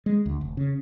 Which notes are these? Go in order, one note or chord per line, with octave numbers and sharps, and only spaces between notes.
G#3
D2
F1
C#3